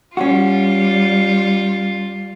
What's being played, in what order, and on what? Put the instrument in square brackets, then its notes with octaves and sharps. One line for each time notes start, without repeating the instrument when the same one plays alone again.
[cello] G3 [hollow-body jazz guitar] C#4 F#4 [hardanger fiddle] F4